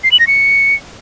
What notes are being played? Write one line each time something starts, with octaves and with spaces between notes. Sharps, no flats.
C7
F#7
A#6
C#7